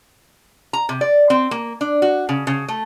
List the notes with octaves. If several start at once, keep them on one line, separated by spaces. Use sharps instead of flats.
A#5
C3
D5
C4
A#3
D4
F#4
C#3
C#3
A3